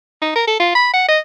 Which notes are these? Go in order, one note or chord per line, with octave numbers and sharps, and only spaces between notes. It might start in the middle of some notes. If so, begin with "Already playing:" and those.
D#4
A#4
A4
F4
B5
F#5
D#5